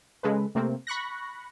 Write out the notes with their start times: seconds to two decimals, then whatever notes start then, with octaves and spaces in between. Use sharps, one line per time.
0.23 C#3 G#3 A4 B4
0.55 C3 A3 A#3 C4
0.87 B5 C#6 F#6 A#6